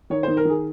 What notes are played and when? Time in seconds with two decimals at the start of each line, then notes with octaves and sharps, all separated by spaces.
0.10 D#3 C#5
0.23 D#3 C5
0.37 A#4
0.45 D#3 G#4